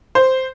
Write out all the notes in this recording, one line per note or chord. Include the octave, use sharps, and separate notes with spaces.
C5